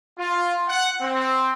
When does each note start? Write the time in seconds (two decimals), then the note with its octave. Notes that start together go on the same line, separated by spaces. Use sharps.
0.19 F4
0.69 F#5
1.01 C4